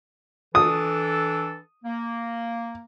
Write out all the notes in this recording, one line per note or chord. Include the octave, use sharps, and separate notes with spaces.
E3 D4 A4 D#6
A#3